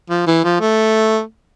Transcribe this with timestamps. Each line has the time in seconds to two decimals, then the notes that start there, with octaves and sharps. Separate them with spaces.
0.10 F3
0.27 E3
0.44 F3
0.60 A3